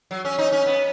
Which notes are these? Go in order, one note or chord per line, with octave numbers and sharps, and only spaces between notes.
F#3
C#4
D#4
C#4
B3